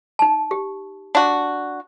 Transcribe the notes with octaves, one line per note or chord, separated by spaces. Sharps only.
D#4 A5
G4
D4 F#4